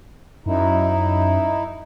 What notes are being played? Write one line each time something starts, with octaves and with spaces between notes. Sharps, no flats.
F#2 D#4 E4